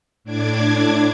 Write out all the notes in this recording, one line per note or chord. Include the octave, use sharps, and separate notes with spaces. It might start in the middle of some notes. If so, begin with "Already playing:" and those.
A2 D4 D6 G#6